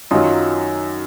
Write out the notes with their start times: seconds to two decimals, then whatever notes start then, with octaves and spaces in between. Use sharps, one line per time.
0.11 F#2 D#3 F#3 D#4 F4